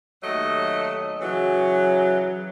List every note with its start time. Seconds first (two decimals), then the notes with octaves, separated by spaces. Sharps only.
0.23 D#2 F#3 A3 D#5
1.21 C#3 E3 F#3